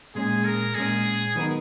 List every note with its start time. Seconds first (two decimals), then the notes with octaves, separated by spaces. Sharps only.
0.15 A#2 G#3 C#4 G#4
0.45 A#4
0.75 A#2 G#3 C#4 G#4
1.35 D#3 F#3 B3 D#4 A#4